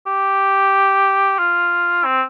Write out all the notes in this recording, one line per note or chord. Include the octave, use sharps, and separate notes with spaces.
G4
F4
C4